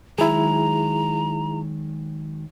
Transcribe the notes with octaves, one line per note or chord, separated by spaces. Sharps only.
D#3 F#3 G#3 E4 G#4 A#5